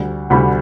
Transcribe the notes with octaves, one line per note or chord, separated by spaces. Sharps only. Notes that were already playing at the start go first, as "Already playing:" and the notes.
Already playing: D2 D3 G3
D2 D3 G3 B5